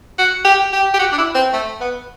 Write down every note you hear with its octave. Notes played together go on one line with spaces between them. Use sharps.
F#4
G4
G4
G4
F#4
D4
E4
C4
A3
B3